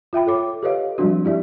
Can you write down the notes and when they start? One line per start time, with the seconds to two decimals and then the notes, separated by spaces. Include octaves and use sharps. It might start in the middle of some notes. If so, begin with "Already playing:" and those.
0.13 F4 E5 G5 B5
0.27 A4 C#5 D6
0.63 G4 A4 B4 C#5 D#5 F5
0.98 F3 G3 G#3 C4 D4 F#4
1.25 E4 G4 D5 E5